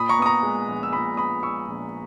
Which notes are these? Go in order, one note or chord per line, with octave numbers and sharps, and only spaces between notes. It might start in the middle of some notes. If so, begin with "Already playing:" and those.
Already playing: A#2 B5 D#6
A#5 C#6
B3 D#6
A#5 C#6
G#3
A#1
E6
A#2 B5 D#6
B3 B5 D#6
G#3 C#6 E6
A#1